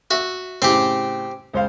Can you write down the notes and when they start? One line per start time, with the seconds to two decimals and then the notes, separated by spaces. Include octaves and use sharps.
0.11 F#4 E5
0.62 A2 C#3 C4 G4
1.53 C#2 C5 F5